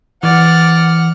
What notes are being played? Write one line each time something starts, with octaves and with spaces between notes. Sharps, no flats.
E3 D5 F#5 F6